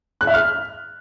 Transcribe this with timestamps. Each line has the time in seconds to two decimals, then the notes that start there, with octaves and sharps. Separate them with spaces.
0.21 F#6
0.27 E5
0.34 F6